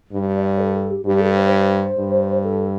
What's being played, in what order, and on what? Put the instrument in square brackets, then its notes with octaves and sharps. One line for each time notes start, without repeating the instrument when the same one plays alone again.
[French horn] G2
[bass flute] D5
A4
A4
G4
[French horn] G2 [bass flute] G4
[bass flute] A4
C5
C5
[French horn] G2
[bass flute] A4